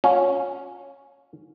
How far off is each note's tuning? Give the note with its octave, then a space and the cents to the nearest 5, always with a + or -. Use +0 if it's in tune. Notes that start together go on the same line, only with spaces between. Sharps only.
C#4 +0 F4 +40